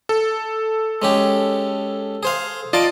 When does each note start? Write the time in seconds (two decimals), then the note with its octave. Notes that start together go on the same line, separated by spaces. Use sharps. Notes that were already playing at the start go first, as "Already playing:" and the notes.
0.09 A4
1.02 G#3 C#4 G4
2.23 G#4 C5 F5
2.73 F4 D5 D#5 A5 D6